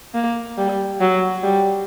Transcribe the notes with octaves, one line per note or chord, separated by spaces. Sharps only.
A#3
G3
F#3
G3